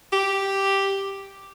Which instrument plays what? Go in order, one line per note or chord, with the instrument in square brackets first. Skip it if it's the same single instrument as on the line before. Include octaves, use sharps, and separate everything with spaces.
[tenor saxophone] G4